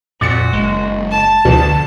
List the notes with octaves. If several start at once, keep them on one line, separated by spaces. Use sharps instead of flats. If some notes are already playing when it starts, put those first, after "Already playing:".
F2 A#2 F#4 D6 A6 C#7
F#1 G#3
A5
D2 B2 D3 E3 F3